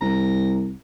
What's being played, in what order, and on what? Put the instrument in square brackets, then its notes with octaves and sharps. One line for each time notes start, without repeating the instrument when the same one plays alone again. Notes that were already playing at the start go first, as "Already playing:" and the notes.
[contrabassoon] C2 [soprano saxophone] A#5